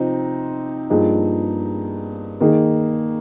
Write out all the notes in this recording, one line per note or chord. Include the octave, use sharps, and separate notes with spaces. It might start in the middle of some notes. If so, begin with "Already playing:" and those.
Already playing: C3 F3 C4 D#4
G2 F3 A#3 D#4 G#4
D#3 A#3 D#4 G#4